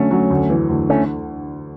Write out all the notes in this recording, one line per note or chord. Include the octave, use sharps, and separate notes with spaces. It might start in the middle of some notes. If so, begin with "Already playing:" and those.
Already playing: D3 F#3 A3 C#4
F#3
D2
E3
D2
D3 A3 C#4